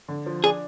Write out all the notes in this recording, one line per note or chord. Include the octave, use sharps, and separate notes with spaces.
D3
F3
D4 G#4